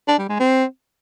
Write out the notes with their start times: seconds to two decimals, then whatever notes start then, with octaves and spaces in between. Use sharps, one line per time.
0.08 D4
0.19 G3
0.29 G#3
0.40 C4